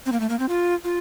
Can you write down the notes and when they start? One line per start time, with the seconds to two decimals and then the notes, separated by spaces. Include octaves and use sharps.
0.06 C4
0.12 A#3
0.20 A3
0.30 A#3
0.39 C4
0.49 F4
0.84 F4